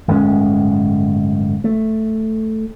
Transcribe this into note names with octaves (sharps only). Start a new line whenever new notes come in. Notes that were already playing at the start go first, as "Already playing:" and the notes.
D1 G1 G#3 C#4
A3